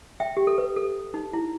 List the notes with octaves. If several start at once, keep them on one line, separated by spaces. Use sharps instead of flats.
E5 G5
G4
A4
B4
A4
D#4
E4